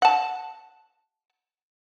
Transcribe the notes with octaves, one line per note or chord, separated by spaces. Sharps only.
F#5 A5